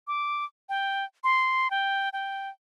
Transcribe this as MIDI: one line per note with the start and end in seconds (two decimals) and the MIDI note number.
0.07 0.45 86
0.69 1.05 79
1.24 1.70 84
1.70 2.09 79
2.13 2.50 79